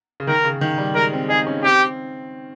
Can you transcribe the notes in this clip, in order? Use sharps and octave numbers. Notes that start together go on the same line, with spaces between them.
C#3
D#3 A#4
C#3
D#3
G3
G#3 A#4
C4
D#4 G#4
C#4
C4 G4